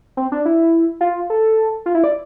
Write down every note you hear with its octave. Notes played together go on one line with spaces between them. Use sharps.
C4
D4
E4
F4
A4
F4
E4
D5